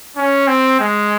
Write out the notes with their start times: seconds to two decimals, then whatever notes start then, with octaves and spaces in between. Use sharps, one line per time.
0.17 C#4
0.48 C4
0.80 G#3